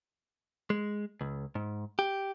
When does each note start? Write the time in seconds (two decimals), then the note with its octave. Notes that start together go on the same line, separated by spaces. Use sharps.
0.70 G#3
1.21 C#2
1.55 G#2
1.99 G4